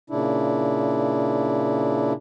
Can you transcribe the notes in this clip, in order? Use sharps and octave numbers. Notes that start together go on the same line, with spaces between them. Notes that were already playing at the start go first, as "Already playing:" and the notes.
A#2 C#3 D4 E4